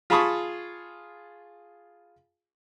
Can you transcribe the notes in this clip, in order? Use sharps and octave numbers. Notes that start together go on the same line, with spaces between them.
F4 G#4 A5 B5 C#6 D#6